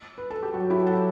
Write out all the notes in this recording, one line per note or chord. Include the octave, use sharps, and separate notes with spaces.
B4
A4
G4
F#3 F#4
E4 G4
F#4 A4